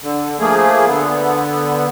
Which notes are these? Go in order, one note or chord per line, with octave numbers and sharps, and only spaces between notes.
D3
F3 A3 A#3 G#4
D3 B3